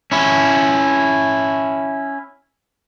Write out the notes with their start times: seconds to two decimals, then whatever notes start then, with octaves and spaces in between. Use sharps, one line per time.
0.12 C#4 E4